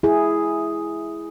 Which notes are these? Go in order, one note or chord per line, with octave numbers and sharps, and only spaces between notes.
E4 G#4